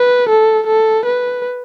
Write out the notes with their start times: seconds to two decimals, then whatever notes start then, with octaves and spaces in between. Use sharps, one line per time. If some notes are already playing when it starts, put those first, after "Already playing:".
Already playing: B4
0.29 A4
0.67 A4
1.05 B4